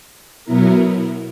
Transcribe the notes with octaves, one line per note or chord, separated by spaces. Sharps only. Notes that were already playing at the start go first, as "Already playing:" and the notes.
B2 F#3 B3 E4 A#4